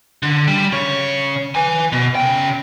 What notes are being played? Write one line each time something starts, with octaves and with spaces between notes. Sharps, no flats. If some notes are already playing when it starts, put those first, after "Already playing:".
D3
G3
C#3 C#5
B4 G#5
B2
C#3 G5